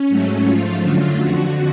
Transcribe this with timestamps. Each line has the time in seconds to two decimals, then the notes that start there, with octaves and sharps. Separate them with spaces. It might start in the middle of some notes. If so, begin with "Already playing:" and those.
Already playing: C#4
0.09 G#2 F#3 A3
0.46 G#2 F3 A3 F4
0.82 F#2 D3 F#3 A3
1.19 F2 D3 F3 F#4